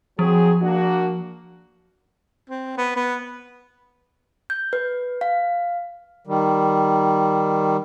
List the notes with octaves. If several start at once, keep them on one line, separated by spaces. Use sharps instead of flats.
F3 F#3 C4 G#4
A#3 D4 F#4
C4
B3
B3
G6
B4
F5
D#3 G3